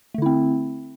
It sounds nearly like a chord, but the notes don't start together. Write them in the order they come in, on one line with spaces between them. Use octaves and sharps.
A3 D3 E4 C4